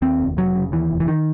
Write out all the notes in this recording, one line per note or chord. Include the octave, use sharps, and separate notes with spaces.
D#2 C4
F1
F1 F#3
C#3
D#2 E3
F1
E3
D#3